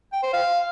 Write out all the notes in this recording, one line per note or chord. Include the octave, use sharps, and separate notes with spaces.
G5
C5
F5